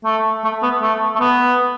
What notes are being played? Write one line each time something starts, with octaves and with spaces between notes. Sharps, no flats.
A3
A3
B3
A3
A3
B3